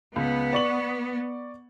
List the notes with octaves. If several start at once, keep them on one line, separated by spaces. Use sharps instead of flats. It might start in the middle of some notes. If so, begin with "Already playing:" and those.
C#2 B3
D5 C#6 F#7